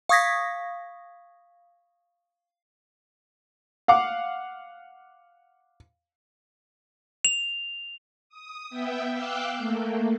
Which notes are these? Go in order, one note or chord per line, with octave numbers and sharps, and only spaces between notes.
F5 C#6 D#6 G#6 A#6 B6
F5 F#5 D6
F7
D#6
B3 E5 G5
F5 G5 D6 E6 F#6 G6
A3 A#3